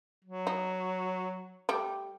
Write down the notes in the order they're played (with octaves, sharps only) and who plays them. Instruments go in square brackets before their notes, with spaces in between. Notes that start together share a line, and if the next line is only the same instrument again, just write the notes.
[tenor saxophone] F#3
[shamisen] D#4
G3 A3 G4